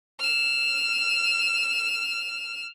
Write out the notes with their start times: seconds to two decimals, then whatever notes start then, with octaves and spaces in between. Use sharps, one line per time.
0.19 F6 E7